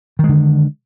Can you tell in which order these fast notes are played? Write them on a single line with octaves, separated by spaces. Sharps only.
D#3 G#3 D3